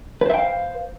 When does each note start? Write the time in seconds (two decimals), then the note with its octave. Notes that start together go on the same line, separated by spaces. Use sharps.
0.21 B4
0.26 C5
0.30 E5
0.34 G5
0.38 F5